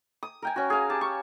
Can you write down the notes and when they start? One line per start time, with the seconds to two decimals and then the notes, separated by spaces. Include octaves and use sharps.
0.23 D#6
0.42 A#4 G5 G#5
0.56 C#4 F#4
0.70 G#4 F5
0.90 G4 A5
1.01 C#6